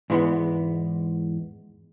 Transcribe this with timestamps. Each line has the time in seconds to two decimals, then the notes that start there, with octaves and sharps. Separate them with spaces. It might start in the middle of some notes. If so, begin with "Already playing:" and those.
0.10 E2 G#2 E3 G#3 B3